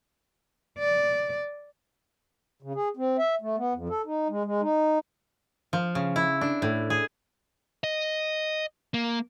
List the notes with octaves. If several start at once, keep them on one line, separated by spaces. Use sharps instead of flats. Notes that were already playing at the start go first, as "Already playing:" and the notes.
D5
C#3
G#4
C4
E5
A3
B3
F2
A4
D#4
G#3
G#3
D#4
F3
C#3
E4
D4
A2
G#4
D#5
A#3